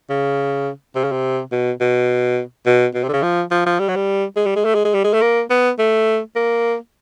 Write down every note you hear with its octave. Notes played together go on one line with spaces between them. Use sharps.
C#3
C3
C#3
C3
B2
B2
B2
B2
C3
D3
C#3
F3
F3
F3
G3
F#3
G3
G#3
G3
G#3
A3
G#3
G#3
G3
G#3
A3
A#3
B3
A3
A#3